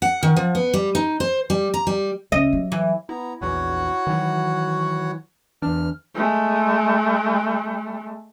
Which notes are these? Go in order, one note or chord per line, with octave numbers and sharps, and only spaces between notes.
F#5
D#3
F3
B3
G3
D#4
C5
G3
A#5
G3
C#2 D#5
F#3 G3
E3
B3 E4 A#5
A#1 E2 F#4 C#5 F#5
D#3 E3 F#3
E2 E3 D4 F6
G#3 A3